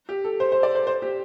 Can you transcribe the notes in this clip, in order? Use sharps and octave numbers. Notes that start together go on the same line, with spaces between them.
G4
A4
C5
C5
D5
C5
C5
G4